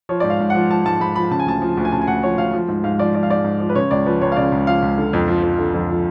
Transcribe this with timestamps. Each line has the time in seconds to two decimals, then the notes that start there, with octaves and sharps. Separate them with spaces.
0.09 F3 C#5
0.20 G#2 D5
0.30 F5
0.40 G#2
0.50 F3 F#5
0.70 F3 A5
0.85 G#2 A5
1.01 G#2 B5
1.16 F3 B5
1.31 C#3 A5
1.40 G#5
1.46 D2 A5
1.62 F3
1.77 D2
1.85 G#5
1.92 C#3 A5
2.01 G#5
2.07 D2 F#5
2.23 F3 C#5
2.38 D2 F5
2.53 F3
2.68 G#2
2.84 G#2 F5
2.99 F3 D5
3.14 F3 D5
3.23 F5
3.30 G#2 D5
3.44 G#2
3.60 F3
3.69 B4
3.75 C#3 C#5
3.91 C#2 D5
4.06 F3 B4
4.21 C#2 C#5
4.32 F5
4.36 C#3 D5
4.52 C#2
4.67 F3 F5
4.82 C#2
4.97 D3
5.13 F2
5.28 F3
5.43 F2
5.58 D3
5.74 F2
5.89 F3